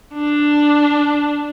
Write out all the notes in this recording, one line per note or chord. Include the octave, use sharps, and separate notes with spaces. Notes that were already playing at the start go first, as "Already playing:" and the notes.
D4